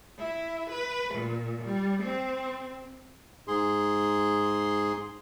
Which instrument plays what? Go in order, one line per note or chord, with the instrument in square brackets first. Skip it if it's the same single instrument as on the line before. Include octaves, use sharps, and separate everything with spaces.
[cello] E4
B4
A#2
G3
C4
[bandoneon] G#2 G#4 C6